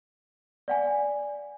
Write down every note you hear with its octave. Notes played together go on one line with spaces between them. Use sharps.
D5 F#5 G#5